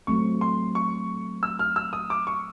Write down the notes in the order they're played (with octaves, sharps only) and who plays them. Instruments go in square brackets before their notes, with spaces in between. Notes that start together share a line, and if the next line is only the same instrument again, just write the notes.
[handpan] F#3 A3 C4 [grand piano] C#6
[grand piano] C6
C#6
E6
F6
E6
D#6
D6
C#6